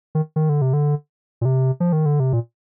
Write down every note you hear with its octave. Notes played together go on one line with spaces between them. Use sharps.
D#3
D#3
D3
C3
D3
A#2
C3
F3
D#3
D3
C3
A#2